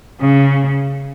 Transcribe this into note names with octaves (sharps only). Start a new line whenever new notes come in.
C#3